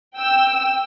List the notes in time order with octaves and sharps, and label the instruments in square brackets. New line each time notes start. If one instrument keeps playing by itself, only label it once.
[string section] G5 E6